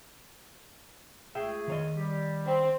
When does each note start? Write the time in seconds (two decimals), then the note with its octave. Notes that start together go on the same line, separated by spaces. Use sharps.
1.35 C#2 A3 G#4 E5 G5
1.68 D#3 C#5 D#5
1.96 G3 G4
2.46 C4